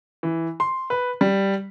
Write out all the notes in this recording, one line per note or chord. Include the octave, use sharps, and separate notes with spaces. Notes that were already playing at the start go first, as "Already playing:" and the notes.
E3
C6
B4
G3